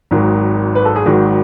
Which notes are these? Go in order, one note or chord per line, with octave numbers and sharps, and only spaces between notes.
G#1 G#2 D#3 F#3
B4
A4
G#4
G#1 G#2 D#3 F#3 F#4